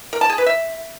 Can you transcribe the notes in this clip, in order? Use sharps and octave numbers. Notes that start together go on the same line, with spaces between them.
A#4
A5
G#4
B4
E5